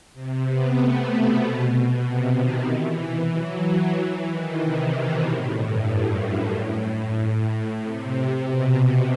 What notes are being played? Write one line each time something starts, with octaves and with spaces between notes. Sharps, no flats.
C3
B3
A3
B2
C3
D#3
E3
F#3
E3
D#3
C3
B2
A2
G2
F#2
F#2
A2
C3
B2